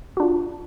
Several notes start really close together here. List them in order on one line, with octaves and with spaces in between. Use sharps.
F#4 D4 F4